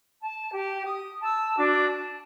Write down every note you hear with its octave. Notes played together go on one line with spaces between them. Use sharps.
A5
G4
D#6
A5 E6
D4 F#4 D6
A5